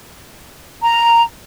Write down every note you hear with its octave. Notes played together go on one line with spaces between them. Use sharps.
A#5